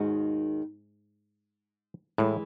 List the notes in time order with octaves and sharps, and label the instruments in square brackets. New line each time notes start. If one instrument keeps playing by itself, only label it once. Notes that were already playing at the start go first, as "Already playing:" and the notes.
Already playing: [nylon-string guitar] D#2 D#3 G#3 D#4 F#4 [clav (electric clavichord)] G#2
[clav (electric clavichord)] A2 [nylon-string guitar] E3 G#3